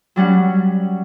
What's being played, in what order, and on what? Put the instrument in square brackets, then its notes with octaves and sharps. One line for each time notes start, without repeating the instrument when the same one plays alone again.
[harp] F#3 G3 C#4 F#5